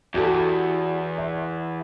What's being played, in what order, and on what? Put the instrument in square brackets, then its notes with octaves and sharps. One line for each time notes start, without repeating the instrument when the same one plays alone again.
[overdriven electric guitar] E2 [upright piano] F#4 G4 A4
[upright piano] E5